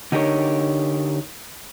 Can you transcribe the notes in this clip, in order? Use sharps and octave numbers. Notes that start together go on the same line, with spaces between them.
D3 D#4 G4 A#4 C#5